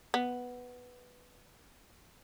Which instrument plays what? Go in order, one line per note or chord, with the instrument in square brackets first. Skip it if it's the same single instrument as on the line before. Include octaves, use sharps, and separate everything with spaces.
[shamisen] B3